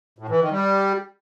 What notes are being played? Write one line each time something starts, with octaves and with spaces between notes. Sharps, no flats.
A2
E3
D#3
G3